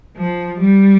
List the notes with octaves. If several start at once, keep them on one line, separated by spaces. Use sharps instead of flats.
F3
G3